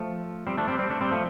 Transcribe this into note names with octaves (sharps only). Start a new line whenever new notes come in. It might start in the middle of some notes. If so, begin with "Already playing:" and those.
Already playing: F3 A3
G3 C4
A3 D4
G3 C4
G3 C4
A3 D4
G3 C4
F3 A3